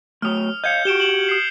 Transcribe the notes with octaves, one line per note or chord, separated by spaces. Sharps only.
F#3 A3 D#6 F6
D#5 F5 G6 G#6 C#7
F#4 G4 D7 E7 G7
E7 F#7
D#6 C7